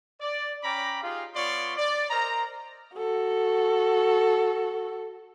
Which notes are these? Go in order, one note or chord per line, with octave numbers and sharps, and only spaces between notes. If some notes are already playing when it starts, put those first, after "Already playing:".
D5
C#4 G5 A#5 B5 D6
D#4 F4 G4 G#4 F5
B3 F4 C#5 D5 C6 C#6
D5
A#4 C5 D#5 A#5
F#4 A4